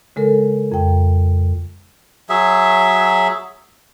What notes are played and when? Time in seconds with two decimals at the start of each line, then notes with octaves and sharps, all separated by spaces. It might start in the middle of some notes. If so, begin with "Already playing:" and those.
0.16 C#3 G#3 A4 A#4
0.72 F2 G5
2.29 F#3 G#4 E5